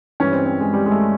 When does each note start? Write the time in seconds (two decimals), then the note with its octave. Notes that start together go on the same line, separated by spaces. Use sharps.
0.20 G2 E3 C#4
0.33 C4
0.46 C4
0.60 G#3
0.73 G3
0.86 G#3
0.91 A3